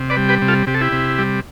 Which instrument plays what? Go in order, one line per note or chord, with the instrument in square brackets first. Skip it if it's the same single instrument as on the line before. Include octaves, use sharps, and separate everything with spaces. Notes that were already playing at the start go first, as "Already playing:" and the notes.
Already playing: [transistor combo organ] C3
B4 D5
G3
G4 B4
C3
F4 A4
C3 G4
A4
E4 G4
C3
G3